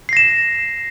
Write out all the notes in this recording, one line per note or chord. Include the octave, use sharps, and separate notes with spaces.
A#6 C7 E7